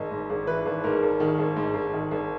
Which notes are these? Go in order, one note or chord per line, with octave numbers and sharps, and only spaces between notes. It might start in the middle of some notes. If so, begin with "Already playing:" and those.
Already playing: G#1 D#5
G#2
G#1
E3 B4
G#1
G#2 A#4
G#1
D#3
G#1
G#2
G#1
D#3
G#1